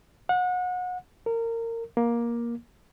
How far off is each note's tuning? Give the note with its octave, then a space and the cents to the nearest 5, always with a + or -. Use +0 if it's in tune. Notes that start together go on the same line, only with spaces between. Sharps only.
F#5 -30
A#4 -25
A#3 +15